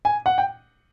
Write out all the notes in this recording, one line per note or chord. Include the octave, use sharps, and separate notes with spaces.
G#5
F#5
G5